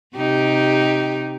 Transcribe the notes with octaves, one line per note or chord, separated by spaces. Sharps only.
C3 D#4 G4